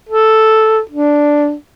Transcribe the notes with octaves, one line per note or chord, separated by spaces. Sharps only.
A4
D4